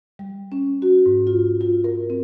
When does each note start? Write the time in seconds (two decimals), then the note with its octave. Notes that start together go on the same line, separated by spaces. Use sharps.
0.19 G3
0.52 C#4
0.82 F#4
1.06 G#2
1.27 F4
1.61 F4
1.84 A#4
2.10 C4